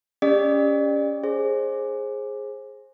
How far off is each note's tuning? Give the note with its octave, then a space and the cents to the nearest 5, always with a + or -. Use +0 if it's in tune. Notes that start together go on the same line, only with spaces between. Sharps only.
C#4 +20 G4 +35 D5 +35
G#4 +0 C5 +30